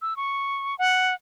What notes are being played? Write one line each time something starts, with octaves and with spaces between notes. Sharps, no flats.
E6
C#6
F#5